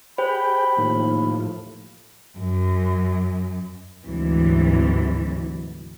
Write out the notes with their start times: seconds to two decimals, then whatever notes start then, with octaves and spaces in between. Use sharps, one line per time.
0.18 G4 G#4 C5 G5 B5
0.78 D#2 A2 F3
2.38 F#2
4.04 D2 G#2 C3 E3 F#3